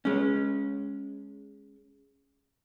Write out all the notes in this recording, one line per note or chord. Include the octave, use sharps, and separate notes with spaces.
G#3 C#4